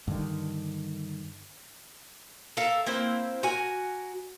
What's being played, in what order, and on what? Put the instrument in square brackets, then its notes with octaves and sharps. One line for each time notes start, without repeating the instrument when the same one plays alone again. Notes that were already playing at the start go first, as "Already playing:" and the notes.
[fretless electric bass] G2 D3 D#3
[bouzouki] A4 A#4 E5 F5
A#3 C4 E4 C5
F#4 A#4 G#5